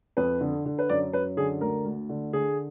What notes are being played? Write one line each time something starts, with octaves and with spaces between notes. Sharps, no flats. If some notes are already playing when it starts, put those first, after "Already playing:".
F2 B4
D3
D3
B4
F#2 D5
F#2 B4
D3 G#4
D2 A#4
D2
D3
D3 G#4